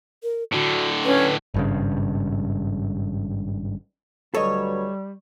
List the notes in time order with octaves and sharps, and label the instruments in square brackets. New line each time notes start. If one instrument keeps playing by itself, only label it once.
[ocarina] A#4
[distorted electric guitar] A2 D3 [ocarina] F#4
[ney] C#4 [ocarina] B4
[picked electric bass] G#1 G2 C#3
[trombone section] D2 F#3 B4 [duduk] G3 [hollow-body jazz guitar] A4 D#5 [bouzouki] C#5